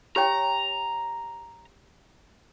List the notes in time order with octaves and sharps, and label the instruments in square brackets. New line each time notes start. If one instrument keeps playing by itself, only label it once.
[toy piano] G4 C#5 G5 [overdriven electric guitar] A#5